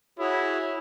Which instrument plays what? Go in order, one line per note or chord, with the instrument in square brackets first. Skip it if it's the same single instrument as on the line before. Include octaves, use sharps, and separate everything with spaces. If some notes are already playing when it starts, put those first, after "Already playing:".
[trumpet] E4 [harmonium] F#4 G#4 C#5